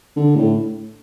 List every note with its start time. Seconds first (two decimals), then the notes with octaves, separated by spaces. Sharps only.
0.17 D3
0.35 A2